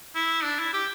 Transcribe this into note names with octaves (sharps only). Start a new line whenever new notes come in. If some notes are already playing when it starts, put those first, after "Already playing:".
E4
D4
E4
G4